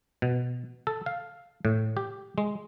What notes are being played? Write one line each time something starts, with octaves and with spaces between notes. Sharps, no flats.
B2
A4
F5
A2
G4
G#3